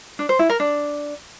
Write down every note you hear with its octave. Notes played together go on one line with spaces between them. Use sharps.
D4
C5
E4
A#4
D4